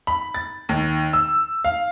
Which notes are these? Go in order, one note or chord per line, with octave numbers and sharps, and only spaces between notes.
B5
A6
D#2
E6
F5